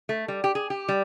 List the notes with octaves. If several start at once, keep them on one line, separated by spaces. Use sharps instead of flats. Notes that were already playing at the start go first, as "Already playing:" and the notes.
A3
G3
G4
G#4
G4
G3